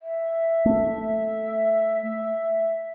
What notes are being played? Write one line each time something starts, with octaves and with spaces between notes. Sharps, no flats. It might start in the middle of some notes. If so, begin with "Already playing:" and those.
E5
A3